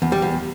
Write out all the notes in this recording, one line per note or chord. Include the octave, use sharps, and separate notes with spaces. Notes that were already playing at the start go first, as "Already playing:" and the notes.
E2
G3
E2